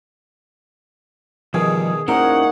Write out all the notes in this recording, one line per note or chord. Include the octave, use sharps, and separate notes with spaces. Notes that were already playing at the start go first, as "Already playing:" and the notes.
E2 B2 D#3 F3 G3 G#4
A#2 C#4 D#4 E4 F#4 A#4 C5 F#5